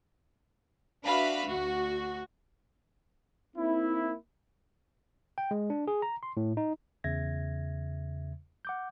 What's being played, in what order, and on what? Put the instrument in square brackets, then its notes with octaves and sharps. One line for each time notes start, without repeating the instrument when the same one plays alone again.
[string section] D4 F#4 B4 E5 F5 B5
D2 F#4
[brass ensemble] A#3 C4 D#4 E4
[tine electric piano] G5
G#3
D4
G#4
A#5
C6
A2
D#4
E2 C#3 E5 G#6 A#6
F#5 D6 G6